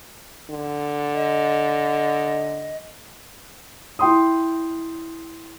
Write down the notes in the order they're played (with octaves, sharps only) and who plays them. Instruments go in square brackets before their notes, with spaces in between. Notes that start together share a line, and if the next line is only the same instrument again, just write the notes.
[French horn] D3
[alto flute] D#5
[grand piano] E4 G5 C6 D#6